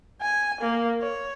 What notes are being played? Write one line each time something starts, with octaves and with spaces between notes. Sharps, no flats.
G#5
A#3
C#5